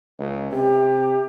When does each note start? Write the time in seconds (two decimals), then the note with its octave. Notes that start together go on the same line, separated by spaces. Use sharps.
0.19 C#2
0.52 C3 G4